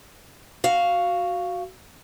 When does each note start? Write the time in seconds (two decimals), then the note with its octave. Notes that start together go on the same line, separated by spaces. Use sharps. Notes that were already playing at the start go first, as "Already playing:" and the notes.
0.64 F#4 F5